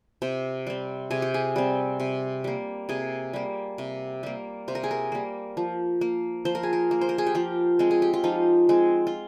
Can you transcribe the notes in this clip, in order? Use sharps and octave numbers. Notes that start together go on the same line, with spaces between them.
C3 C5
G3 C4
C3 G#4
G4
G#4
G3 C4
C3
G3 A#3
C3 G#4
G3 A#3
C3
G3 A#3
C3 C5
A#4
G#4
A#4
G3 A#3
F3
A#3
F3 C5
A#4
G#4
A#4
A#3
C5
A#4
G#4
G4
F3 F4
G#3 C4
G#4
G4
F4
F3 D#4
G#3 C4
F4